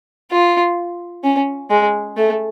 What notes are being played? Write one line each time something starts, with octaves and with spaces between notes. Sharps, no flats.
F4
C#4
G#3
A3